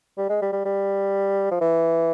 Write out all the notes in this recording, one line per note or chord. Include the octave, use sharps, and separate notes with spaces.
G3
G#3
G3
G3
G3
F3
E3